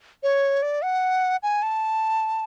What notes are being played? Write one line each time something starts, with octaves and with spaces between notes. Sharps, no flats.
C#5
D5
F#5
G#5
A5